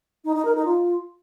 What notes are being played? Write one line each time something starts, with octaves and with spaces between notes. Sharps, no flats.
D#4
D#4
A#4
D#4
F4